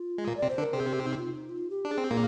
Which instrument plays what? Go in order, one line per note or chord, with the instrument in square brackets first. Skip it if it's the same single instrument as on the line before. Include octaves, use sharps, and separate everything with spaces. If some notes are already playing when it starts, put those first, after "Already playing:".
Already playing: [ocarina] F4
[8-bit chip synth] G#3
A#2 A#3
[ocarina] D5
[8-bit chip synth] C3 C4
[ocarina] C5
[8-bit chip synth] D3 D4
[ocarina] A#4
[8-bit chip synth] C3 C4 [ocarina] G#4
[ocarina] G4
D#4
F4
D#4
F4
G4
[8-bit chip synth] D4 [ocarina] G#4
[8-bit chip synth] C4
[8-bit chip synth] A#2 A#3 [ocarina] G#4